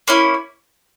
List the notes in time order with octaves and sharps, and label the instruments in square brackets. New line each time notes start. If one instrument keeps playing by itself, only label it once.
[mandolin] A#3 C#4 E4